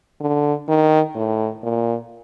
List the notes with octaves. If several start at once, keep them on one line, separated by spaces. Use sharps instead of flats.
D3
D#3
A2
A#2